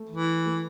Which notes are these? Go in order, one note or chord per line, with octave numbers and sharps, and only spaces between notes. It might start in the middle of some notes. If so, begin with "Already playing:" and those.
Already playing: A3
E3
A3